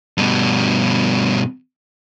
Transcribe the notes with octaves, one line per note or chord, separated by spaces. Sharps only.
G2 B2